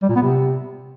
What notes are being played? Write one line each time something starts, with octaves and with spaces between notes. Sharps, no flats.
G3
A#2
B3
C3